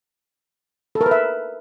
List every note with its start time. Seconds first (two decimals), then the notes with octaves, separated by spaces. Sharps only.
0.95 A4
1.01 A#4
1.06 B4
1.11 E5